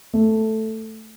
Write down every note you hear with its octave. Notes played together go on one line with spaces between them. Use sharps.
A3